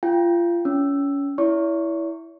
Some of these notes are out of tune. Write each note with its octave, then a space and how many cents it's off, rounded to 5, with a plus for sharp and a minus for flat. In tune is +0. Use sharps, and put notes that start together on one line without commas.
F4 -25 G5 +0
C#4 +25 E6 +0
E4 +0 C#5 +45 C#6 -20